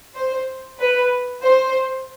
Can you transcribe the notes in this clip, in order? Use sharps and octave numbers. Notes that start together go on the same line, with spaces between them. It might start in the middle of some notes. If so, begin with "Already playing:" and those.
C5
B4
C5